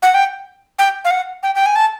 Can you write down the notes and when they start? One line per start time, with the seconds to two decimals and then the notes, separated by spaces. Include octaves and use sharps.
0.02 F#5
0.14 G5
0.79 G5
1.05 F5
1.11 F#5
1.43 G5
1.55 G5
1.66 G#5
1.76 A5